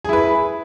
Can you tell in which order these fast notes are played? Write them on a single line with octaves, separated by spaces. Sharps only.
G#4 E4 B4